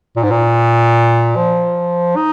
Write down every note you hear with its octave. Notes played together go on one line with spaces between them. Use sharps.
A#2
G#2
A#2
F3
D#4